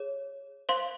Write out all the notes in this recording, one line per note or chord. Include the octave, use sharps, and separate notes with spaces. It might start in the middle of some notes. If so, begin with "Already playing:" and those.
Already playing: G#4 C#5
C5 F5 C6